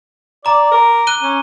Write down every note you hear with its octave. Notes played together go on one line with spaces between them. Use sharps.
D5 A#5 D6
A#4
F#6 D#7 G7
C#4